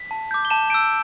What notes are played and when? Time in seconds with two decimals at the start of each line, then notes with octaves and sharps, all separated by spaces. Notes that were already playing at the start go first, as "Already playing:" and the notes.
Already playing: B6
0.11 A5
0.31 D6 G6
0.45 G7
0.50 A5 E7
0.70 E6 G6 D7